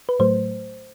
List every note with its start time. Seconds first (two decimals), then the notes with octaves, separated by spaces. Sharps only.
0.09 B4
0.19 A2 F#3 A3 C5